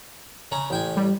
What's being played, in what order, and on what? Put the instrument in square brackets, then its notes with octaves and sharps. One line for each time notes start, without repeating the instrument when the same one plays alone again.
[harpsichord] C#3 C#4 A#5
A1 G5 G#5
[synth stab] G3